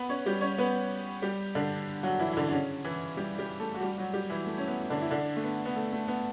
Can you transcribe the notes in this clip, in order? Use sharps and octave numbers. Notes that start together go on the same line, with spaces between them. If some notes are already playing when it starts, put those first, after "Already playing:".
Already playing: B3 B4
C#4 C#5
G3 G4
C#4 C#5
B3 B4
G3 G4
D3 D4
F#3 F#4
E3 E4
E4
D3 D4
D4
C#3 C#4
E3 E4
G3 G4
G3 G4
A3 A4
F#4
G3 G4
F#3 F#4
G3 G4
E3 E4
A3
C#4
B3
D3 D4
E4
D3 D4
A3
B3
B3
A3
A3
B3